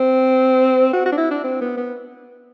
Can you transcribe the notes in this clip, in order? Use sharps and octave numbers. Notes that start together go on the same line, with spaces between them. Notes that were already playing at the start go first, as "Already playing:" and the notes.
Already playing: C4
F#4
F#4
D4
E4
D4
C4
B3
B3